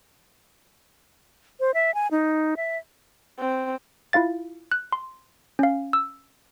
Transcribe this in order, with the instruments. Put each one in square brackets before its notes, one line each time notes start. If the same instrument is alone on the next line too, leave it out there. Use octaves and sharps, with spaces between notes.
[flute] C5
E5
G#5
D#4
E5
[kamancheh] C4
[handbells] E4 F4 F5 A6
F#6
C6
C#4 F5
E6